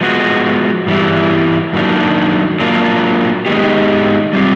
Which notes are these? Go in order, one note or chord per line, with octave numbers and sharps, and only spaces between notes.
F3 G#3 B3 D4 F#4
G2 E3 G3 B3 E4
F#2 D#3 F#3 A#3 D4
F#3 A#3 D4 F4
D#3 G#3 B3 D#4 G4
G3 C4 F4